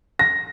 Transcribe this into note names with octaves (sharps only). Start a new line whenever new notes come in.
A#6